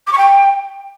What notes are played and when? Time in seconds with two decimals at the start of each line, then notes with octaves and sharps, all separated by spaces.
0.07 D6
0.12 C#6
0.17 G5